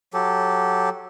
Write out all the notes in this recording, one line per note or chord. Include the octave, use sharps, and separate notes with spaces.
F#3 G4 A4